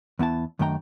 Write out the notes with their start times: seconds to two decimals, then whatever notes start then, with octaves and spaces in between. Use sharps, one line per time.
0.19 E2 B3 E4 A5
0.59 F#2 D#3 A3 D4 G5 A#5